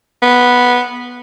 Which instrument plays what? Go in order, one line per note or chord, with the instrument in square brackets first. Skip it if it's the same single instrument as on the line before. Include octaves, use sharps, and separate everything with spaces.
[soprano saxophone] B3